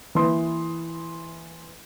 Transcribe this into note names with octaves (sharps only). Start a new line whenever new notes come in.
E3 A#3 E4 B4 C6 D#6